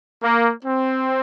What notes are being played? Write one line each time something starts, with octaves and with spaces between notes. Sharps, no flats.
A#3
C4